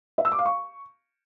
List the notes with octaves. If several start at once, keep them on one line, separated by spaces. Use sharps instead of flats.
E5
E6
D6
F5
C#6